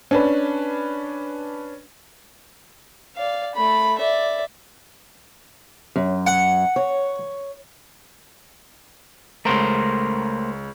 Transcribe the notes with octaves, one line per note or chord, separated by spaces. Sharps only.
C#4 D4 B4
D5 F5
A3 B5
D5 E5
F#2
F#5
C#5
C#2 A3 A#4 C5 A#5